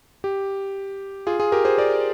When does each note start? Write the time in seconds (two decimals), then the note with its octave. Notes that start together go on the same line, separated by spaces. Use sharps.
0.24 G4
1.27 F4 G#4
1.39 F4 G#4
1.52 G4 A#4
1.65 G#4 C5
1.78 A#4 D5